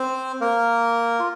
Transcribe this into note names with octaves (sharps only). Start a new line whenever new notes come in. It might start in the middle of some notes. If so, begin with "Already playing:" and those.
Already playing: C4 C5
A#3 A#4
F4